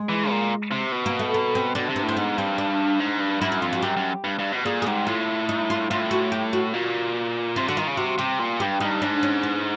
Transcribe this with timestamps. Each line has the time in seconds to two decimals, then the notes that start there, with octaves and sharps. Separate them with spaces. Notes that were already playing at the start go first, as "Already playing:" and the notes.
Already playing: G#3
0.09 E3
0.30 A#2
0.71 C3
0.92 B2
1.06 A#3
1.19 A3
1.34 A#3
1.55 C4
1.75 B2 D4
1.89 C3
1.96 B3
2.03 A2
2.09 C4
2.17 G#2 B3
2.37 G2 C4
2.58 D4
3.00 G#2
3.20 G2
3.41 F#2 E4
3.52 E4
3.61 F2 F4
3.73 F#4
3.82 F#2 G4
3.97 F#2
4.24 G2
4.39 G2
4.52 B2
4.65 A#2 G#4
4.82 G#4
4.86 G#2 G4
5.07 A2 F4
5.49 D#4
5.70 F4
5.91 A2 F4
6.11 F#4
6.32 G4
6.53 F#4
6.74 A#2
7.56 C3 F4
7.66 D3 F#4
7.77 D#3 F4
7.87 C#3
7.97 C3 F#4
8.18 C3 G4
8.39 A#2
8.60 G2 G4
8.80 G2 D#4
9.02 G#2 D4
9.23 C#4
9.43 B3